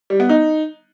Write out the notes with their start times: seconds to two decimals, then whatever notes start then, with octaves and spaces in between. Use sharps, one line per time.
0.10 G3
0.20 B3
0.29 D#4